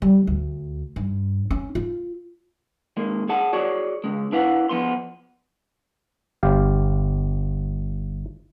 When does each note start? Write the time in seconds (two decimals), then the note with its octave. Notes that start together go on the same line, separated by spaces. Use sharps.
0.02 G3
0.27 D2
0.96 G2
1.51 C#4
1.75 F4
2.97 D#2 G#3 A#3
3.29 G#4 F#5 A5
3.53 F#4 G#4 C#5 D5
4.04 C#3 G#3
4.32 D4 E4 B4 F5 F#5
4.69 F3 B3 C6
6.43 G1 G4 F5